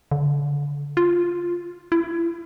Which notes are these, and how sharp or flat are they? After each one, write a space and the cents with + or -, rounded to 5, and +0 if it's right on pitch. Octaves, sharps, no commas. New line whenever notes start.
D3 -30
F4 +0
E4 +30